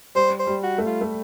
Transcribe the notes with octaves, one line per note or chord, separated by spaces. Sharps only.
G3 C5
C5
G3
F#4
A3
F4
A3